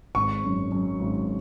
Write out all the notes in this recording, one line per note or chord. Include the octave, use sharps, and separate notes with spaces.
G#1 C#6
F#2
F#2
G#1